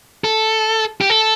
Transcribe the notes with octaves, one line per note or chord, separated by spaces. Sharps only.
A4
G4
A4